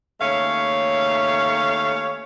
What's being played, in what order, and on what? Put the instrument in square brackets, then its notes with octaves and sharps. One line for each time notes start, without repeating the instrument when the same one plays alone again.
[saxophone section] D#2 A3 C#4 C#5 F5